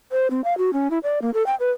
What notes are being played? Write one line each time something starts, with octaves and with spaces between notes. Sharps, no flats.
C5
C4
F5
F#4
C#4
E4
D5
A#3
A4
G5
B4